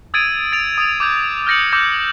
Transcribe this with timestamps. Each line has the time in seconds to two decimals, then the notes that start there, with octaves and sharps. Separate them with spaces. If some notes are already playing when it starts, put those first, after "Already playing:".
0.14 D#6 E6 G#6 A6 D7 D#7
0.52 A6 D7 F7
0.78 D#6
1.00 D6 G6 G#6
1.47 F6 G6 A#6 C#7 F#7
1.72 D6 E6 G6 A#6 C#7